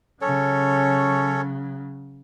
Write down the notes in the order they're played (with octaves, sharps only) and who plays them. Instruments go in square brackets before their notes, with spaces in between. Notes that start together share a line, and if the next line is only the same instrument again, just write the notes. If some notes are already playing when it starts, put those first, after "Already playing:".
[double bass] C#3 F#3 [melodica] C#4 A4 C#5